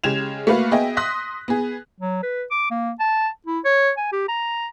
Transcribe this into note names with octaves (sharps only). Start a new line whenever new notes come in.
C#3 G#3 G4 G#6 E7 F7
A3 A#3 F#4 B4 F5
B3 G#4 D#5 E5 G5
C6 D#6 F#6 A#6 B6
B3 G#4
F#3
B4
D6
A#3
A5
E4
C#5
G#5
G4
A#5